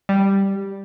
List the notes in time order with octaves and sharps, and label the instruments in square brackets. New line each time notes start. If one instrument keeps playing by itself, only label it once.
[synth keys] G3